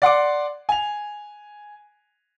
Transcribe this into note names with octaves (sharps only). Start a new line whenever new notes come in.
D5 F#5 C6 D6
G#5 F7